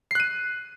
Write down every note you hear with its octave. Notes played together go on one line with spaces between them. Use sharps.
F#6 C7 D#7